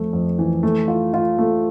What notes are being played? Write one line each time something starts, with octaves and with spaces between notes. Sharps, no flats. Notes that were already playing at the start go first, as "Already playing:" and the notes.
Already playing: F2 A3
F2
E3
A3
F4
F4
A3